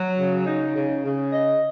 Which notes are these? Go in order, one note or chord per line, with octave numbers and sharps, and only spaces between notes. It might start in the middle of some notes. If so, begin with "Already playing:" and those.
Already playing: F#3
C#3
D#4
C#3
C#3
D#5